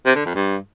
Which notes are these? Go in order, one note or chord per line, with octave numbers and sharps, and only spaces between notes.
C3
D3
F2
G2